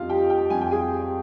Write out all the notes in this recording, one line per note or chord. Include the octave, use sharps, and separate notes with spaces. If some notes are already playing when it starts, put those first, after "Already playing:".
Already playing: F2 D#4 F4 D#5 F5
G3 G4 G5
G4 G5
F2 G#5
G5
G#4 G#5
G3